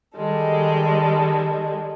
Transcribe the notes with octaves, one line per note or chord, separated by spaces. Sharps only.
D#3 G3 G#3 A4